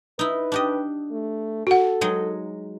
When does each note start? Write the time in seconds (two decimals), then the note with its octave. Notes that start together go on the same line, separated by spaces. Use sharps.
0.19 D#4 E4 B4
0.52 D4 G4 D#5
1.11 A3
1.67 F#4 A4 F#5
2.01 F#3 G#3 D#4